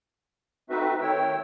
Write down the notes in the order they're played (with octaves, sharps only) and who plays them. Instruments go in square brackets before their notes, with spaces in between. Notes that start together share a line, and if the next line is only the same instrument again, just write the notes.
[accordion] A3 C4 D#4 F#4 B4 E5
D#3 A3 C#5 G5 E6